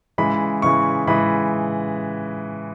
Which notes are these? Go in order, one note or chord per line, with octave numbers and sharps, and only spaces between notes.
C#3 E3 G#3 B5
C#3 E3 G#3 C#6
C#3 E3 G#3 B5